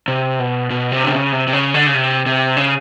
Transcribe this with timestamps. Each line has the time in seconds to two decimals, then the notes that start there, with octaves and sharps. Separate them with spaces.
0.08 C3
0.39 B2
0.70 B2
0.92 C3
1.04 D3
1.12 C#3
1.32 C3
1.48 C3
1.53 C#3
1.74 D3
1.87 C#3
1.94 C3
2.26 C3
2.57 C#3